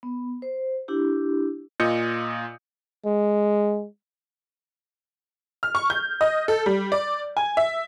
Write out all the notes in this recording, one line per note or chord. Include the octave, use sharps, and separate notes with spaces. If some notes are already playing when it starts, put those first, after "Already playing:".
B3
C5
D4 E4 G4
A#2 F4 D#5 D#6 G6 C#7
G#3
F6
C#6
G6
D#5
A4
G3
D5
G#5
E5